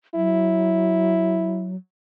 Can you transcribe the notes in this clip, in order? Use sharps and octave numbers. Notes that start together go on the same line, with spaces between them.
F#3 E4